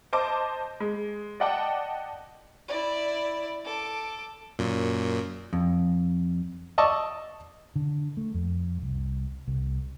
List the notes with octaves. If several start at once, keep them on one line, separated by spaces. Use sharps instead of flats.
C5 D#5 A5 D6
G#3
D5 D#5 F#5 G5 A5 D6
E4 D5
A4 D6
F#2 A#2
F2
D5 D#5 A5 C#6 E6
D3
A3
F2
C2
C2